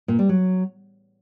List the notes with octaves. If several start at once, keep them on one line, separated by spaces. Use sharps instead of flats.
A#2
G3
F#3